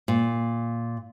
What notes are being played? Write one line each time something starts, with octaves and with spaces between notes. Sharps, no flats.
A#2